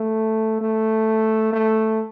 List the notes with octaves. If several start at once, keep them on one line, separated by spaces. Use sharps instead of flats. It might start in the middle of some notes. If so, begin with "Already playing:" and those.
Already playing: A3
A3
A3